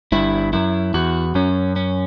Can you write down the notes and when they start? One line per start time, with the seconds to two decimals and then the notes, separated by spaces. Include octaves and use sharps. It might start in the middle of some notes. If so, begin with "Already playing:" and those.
0.12 G1 G2 E4
0.53 F#2 E4
0.94 E2 F#4
1.35 F#2 C#4
1.76 C#4